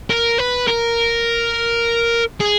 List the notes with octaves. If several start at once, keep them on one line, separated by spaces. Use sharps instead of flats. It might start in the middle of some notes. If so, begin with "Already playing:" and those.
A#4
B4
A#4
G#4